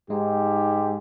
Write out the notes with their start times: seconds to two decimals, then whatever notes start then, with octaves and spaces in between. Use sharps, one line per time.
0.10 G#2 G#3 D#4 G4